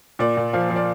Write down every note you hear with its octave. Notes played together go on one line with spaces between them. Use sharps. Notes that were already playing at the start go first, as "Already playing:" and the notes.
A#2 D5
A#2
F3 F5
F3
D5